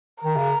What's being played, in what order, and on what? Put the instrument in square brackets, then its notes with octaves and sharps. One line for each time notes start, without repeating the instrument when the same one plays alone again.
[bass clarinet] D#3 [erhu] A#4
[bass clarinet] C#3